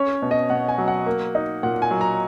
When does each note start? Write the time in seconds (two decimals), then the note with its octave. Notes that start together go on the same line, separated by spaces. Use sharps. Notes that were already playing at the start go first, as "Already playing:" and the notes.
Already playing: C#4 C#5
0.22 B2
0.31 D#5
0.50 B2 F#5
0.68 G#5
0.78 F#3
0.88 F#5
1.06 A#3
1.35 D#4
1.63 A#2 F#5
1.82 G#5
1.91 F#3
2.01 A#5